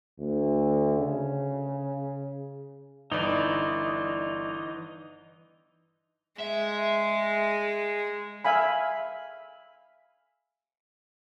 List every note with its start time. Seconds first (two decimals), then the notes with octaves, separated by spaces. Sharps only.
0.19 D2
0.99 C#3
3.12 G1 E3 D#4 D5
6.40 G#3 E5
8.45 E5 F5 G#5 B5